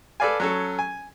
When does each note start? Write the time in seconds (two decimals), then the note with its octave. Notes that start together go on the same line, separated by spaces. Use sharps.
0.20 A4 B4 D5 F5 G#5
0.40 F#3 C#4 A4
0.79 G#5